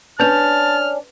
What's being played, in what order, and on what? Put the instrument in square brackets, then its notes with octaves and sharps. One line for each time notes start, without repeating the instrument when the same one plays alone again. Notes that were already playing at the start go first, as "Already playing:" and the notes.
[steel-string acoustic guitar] C#4 D4 [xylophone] B4 G6 F7 [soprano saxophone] A5 [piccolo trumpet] F6